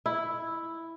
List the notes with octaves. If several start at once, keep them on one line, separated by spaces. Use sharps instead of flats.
E4